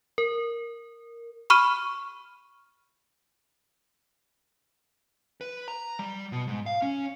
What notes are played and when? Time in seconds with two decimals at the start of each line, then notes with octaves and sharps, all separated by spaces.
0.18 A#4
1.50 B5 C#6 F6 D#7
5.41 B4
5.68 A#5
5.99 G3
6.32 B2
6.48 G#2
6.66 F5
6.82 C#4